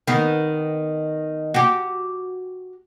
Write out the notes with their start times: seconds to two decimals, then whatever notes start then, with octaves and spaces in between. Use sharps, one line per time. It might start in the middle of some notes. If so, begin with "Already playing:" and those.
0.07 D#3 B3
1.54 F#4 G4